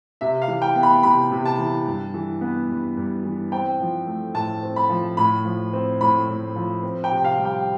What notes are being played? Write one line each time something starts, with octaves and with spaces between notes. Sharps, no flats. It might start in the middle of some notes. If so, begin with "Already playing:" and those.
C3 E5
F5
E3
G5
B3
B5
C3 B5
C3
A5
E3
G2
E3
B3
G2
G2
E3
C4 G5
F3
A3
A2 A5
C4
B5
F3
A2 B5
F3
C4
A2 B5
A2
F3
C4
G5
C3
F5
G3
G5